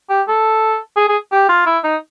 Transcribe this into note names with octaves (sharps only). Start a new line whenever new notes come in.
G4
A4
G#4
G#4
G4
F4
E4
D#4